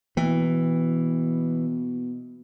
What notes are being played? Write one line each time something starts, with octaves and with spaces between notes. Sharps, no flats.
B2 E3 A#3